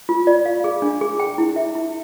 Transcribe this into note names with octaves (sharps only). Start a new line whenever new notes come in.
F4
D5
F5
G#4
D4
G#4
G5
E4
E5
E4